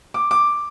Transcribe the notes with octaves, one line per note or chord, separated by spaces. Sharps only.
D6
D6